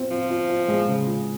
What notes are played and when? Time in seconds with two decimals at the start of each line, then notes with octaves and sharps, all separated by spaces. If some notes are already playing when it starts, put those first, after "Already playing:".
Already playing: C4 F4
0.10 F3 F4
0.30 F4
0.49 F4
0.68 G#3
0.88 C#3
1.07 F4